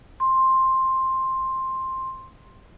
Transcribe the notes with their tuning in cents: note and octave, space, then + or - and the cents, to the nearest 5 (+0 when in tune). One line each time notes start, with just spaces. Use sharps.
C6 +10